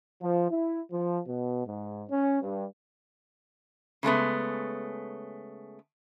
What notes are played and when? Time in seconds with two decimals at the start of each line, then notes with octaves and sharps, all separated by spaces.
0.21 F3
0.50 E4
0.91 F3
1.26 B2
1.65 G#2
2.09 C#4
2.42 G2
4.03 C#3 G#3 A3 B3